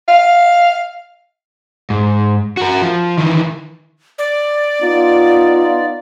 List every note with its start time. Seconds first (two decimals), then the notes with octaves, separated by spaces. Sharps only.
0.08 F5
1.90 G#2
2.57 F#4 A#4
2.82 F3
3.18 D#3 E3
4.18 D5
4.82 B3 D#4 F4